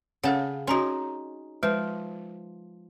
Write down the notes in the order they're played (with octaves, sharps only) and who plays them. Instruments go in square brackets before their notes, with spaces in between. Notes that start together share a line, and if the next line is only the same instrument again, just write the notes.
[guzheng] C#3 A5 [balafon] A4 F5 F#5
[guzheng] C#4 D#4 [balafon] F#4 A#5 C6
[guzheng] F3 [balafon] G#3 B4